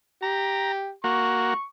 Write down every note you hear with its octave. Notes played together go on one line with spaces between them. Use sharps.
G4 A#5
A#3 F#4 C#6